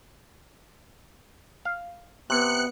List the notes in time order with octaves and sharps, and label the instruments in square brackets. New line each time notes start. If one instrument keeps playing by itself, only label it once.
[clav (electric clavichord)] F5
[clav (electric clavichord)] C3 [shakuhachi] B3 [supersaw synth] F#6 C#7